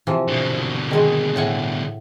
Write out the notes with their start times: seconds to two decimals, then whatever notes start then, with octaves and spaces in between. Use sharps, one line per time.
0.07 C3 E3 F3
0.28 B2 D3
0.91 D#3 G#3
1.36 A2 F#5 G#5